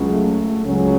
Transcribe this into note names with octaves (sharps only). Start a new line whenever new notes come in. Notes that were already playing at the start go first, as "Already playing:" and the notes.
Already playing: C#2 C#3 F#3
A3
C#2 C#3 F#3 C#4